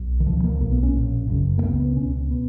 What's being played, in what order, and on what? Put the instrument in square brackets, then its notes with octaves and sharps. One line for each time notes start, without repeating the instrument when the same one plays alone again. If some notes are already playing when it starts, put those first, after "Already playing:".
Already playing: [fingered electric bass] B1
D#3
C#2 B2 F3
A#3
B1 B2 A#3
B3
C#4
A#1 A#2
F#1 F#2 C#3
A#3
C#2 C#3 B3
B3
C#2 B2 C#4
B3